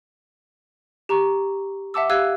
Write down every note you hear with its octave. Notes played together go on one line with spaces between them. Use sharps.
G4 A#5 C#6
E5 F#5 A5 D6 E6
G4 F5 E6 F#6 G#6 D#7